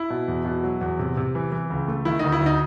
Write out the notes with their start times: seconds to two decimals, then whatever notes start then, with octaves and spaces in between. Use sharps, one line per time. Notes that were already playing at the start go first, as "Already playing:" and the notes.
Already playing: E4
0.10 B2
0.28 E2
0.45 B2
0.63 F#3
0.81 E2
0.99 C3
1.17 C3
1.35 E3
1.52 E3
1.70 C#2
1.88 A3
2.05 D#3 E4
2.19 D2 D#4
2.32 E4
2.41 D2
2.46 D#4